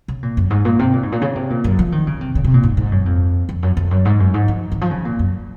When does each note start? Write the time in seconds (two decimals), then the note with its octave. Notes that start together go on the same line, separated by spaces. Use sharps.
0.08 C#3
0.23 A#2
0.37 F#2
0.50 G#2
0.65 A#2
0.79 C3
0.93 A#2
1.03 G#2
1.12 A#2
1.22 C#3
1.35 C3
1.50 A#2
1.64 F#2
1.79 F3
1.92 D#3
2.07 C#3
2.21 C3
2.35 C#3
2.44 C3
2.54 A#2
2.63 G#2
2.77 G#2
2.92 F#2
3.06 F2
3.49 F2
3.63 F#2
3.77 F2
3.91 F#2
4.05 G#2
4.20 F#2
4.34 G#2
4.48 F3
4.72 D#3
4.81 F3
4.91 C#3
5.05 A#2
5.19 F#2